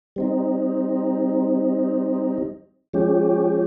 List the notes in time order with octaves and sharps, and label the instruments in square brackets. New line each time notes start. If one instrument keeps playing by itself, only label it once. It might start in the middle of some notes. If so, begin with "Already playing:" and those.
[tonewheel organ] G3 C4 D#4
F3 G#3 C#4 G4